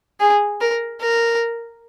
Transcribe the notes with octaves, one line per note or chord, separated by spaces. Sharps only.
G#4
A#4
A#4